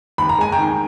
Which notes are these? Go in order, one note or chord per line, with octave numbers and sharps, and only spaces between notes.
D#2 B5
A#5
G#3 G#5
G5 A#5
D#3